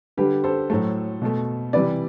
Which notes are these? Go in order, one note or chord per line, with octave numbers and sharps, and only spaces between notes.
D3 G3 G4 B4
A4 C5
A2 F#3 A3
B2 A3
C3 E3 G3 B4 D5